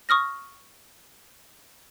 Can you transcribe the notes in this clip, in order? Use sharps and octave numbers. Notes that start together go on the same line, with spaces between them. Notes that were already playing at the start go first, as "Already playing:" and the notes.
C#6 D#6 F6 A#6